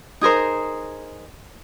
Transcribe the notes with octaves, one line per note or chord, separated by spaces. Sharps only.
D#4 G#4 A#4 C5